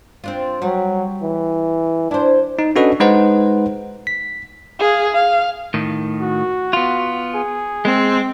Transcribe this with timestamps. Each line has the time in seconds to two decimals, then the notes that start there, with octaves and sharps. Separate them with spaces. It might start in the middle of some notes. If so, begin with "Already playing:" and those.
0.24 C4 D4 F4
0.62 F#3 G3
1.22 E3
2.11 D4 E4 C5
2.59 D#4
2.76 C#4 D4 F#4 A4 B4 D#5
3.00 G#3 D#4 B4 C5 F#5
4.07 B6
4.79 G#4 F5
5.13 F5
5.74 A2 D#3
6.22 F#4
6.73 B3 F4
7.35 G#4
7.85 G#3 C4